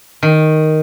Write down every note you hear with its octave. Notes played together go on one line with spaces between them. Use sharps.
D#3